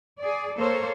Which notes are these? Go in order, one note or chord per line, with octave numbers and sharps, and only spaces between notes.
G#4 D5
A#3 A4 C5 C#5